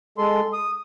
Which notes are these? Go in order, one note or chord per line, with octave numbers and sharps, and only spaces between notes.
G#3 A4 C6
D#6